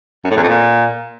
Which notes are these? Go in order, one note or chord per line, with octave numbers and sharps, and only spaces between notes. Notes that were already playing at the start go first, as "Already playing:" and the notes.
F#2
A2
E2
F2
A#2